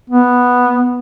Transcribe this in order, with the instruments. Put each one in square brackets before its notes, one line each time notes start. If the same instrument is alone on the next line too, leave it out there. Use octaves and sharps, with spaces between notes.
[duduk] B3